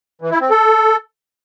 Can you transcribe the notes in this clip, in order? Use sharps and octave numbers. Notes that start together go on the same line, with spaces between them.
E3
E4
C4
A4